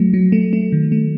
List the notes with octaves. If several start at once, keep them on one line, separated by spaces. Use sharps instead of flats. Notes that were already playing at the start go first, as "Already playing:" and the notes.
Already playing: F#3 A3
F#3
A3
A3
D#3
A3